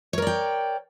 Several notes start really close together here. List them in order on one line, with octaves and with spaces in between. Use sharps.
C#5 A#4 D5 G5